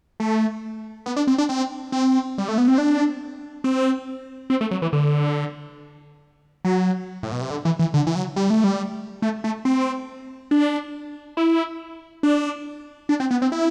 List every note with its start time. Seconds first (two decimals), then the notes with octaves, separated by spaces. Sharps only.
0.20 A3
1.06 B3
1.16 D4
1.27 C4
1.38 D4
1.49 C4
1.92 C4
2.38 G3
2.49 A3
2.58 B3
2.68 C4
2.78 D4
3.64 C4
4.50 C4
4.61 A3
4.71 F#3
4.82 E3
4.93 D3
6.65 F#3
7.23 A2
7.32 B2
7.41 C3
7.50 D3
7.65 E3
7.79 E3
7.94 D3
8.07 E3
8.15 F#3
8.36 G3
8.50 A3
8.64 G3
9.22 A3
9.44 A3
9.65 C4
10.51 D4
11.37 E4
12.23 D4
13.09 D4
13.20 C4
13.31 B3
13.42 C4
13.52 E4